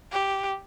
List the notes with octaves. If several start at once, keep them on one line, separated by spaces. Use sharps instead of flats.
G4